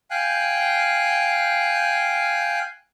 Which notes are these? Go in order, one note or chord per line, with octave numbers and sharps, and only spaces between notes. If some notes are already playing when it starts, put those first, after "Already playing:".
F5 G5 G#5 F#6